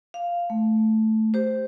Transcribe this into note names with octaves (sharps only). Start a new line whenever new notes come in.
F5
A3
G4 C5